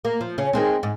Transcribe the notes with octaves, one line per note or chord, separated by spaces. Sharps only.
A#3
F3
C#3 C#4
D#3 G#3 C4
G#2